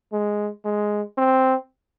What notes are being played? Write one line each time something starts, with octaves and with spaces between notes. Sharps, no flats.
G#3
G#3
C4